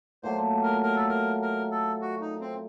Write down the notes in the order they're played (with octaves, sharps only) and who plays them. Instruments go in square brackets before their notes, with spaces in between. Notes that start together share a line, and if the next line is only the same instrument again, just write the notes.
[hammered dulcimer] A#2 F#3 A3 [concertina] C5
[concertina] A#4
A#4
A4
A#4
A#4
A4
F#4
D#4
C4